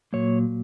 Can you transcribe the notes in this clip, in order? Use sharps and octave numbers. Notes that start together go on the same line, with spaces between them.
A#2 F#3 A#3 C#5